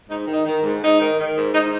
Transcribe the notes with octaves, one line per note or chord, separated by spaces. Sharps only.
G#2 D#4
D#3
D#4
D#3
G#2
G#2 D#4
D#3
D#3
G#2
G#2 D#4